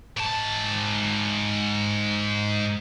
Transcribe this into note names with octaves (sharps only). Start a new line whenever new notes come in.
G#2 A5